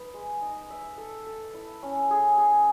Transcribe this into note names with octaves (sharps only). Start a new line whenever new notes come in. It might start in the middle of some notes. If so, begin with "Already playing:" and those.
Already playing: D#4 B4
G#3
D#4
E5
A4
A4
E4
C#4
G#4
G#4